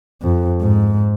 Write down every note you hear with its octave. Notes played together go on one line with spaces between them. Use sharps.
F2
G#2